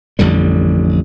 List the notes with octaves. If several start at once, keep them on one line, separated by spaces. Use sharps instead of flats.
A1 F2 D3 G3